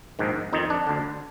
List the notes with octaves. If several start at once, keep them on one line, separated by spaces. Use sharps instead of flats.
A#1 G#2 D#3
F2 D#3 D#4
D4
D2 D3